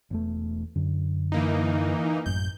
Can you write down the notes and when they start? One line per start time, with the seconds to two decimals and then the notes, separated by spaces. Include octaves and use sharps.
0.11 E1 E2 A3
0.75 F#2 D3
1.32 E3 A#3 D#4
2.26 A1 F#2 G6